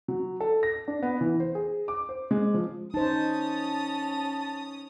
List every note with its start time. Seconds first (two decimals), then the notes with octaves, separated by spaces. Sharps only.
0.08 F#3
0.40 A4
0.63 A#6
0.88 D4
1.02 B3
1.21 E3
1.40 C5
1.55 G#4
1.88 D6
2.09 C5
2.31 G#3
2.54 F3
2.94 C#4 D#4 C5 A5 D#6